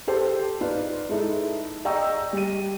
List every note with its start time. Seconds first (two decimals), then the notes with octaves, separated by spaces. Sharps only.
0.07 G4 A4 C5
0.61 D#4 F4 B4 D5
1.09 G#3 D#4 E4 A4
1.85 D5 D#5 G5 A#5 C#6 E6
2.33 G3 D#7